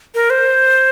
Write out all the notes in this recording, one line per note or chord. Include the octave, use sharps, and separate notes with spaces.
A#4
C5